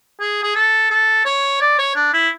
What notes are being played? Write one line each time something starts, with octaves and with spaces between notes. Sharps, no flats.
G#4
G#4
A4
A4
C#5
D5
C#5
D4
E4